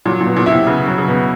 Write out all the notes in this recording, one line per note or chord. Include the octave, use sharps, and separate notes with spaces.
A#2 F#3
A#2
B2
A#2
E4
C3
C#3 B3
F#3
C#3
B2